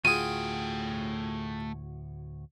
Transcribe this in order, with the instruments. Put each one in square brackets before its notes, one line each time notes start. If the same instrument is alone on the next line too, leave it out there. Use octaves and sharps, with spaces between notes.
[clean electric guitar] D2 A2 F#4 [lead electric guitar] A3 G5 [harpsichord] F4 G#4 [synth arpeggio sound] D#7